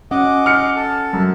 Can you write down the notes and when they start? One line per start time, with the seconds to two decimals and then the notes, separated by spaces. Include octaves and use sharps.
0.11 C#4 D#5 F#5 D6
0.46 F6 C#7
0.76 A4
1.13 F#2